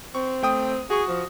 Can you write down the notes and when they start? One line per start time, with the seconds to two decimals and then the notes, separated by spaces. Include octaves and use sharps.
0.15 C4 C#6
0.43 A3 G5 D#6
0.90 F#4 G#4 C#6
1.08 F3